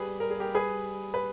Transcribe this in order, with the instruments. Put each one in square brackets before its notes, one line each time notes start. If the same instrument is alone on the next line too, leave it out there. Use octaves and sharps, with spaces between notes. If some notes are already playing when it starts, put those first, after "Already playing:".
Already playing: [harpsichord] G3 [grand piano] G#4 B4
[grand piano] A#4
G#4
G4 A#4
G#4 B4
B4